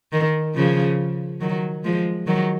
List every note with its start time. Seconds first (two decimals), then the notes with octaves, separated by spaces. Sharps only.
0.12 D#3
0.55 C#3 F3
1.41 D#3 F#3
1.84 F3 G#3
2.27 D#3 F#3